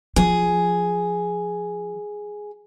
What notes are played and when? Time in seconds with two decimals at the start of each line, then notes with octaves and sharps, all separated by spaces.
0.16 F3 G#4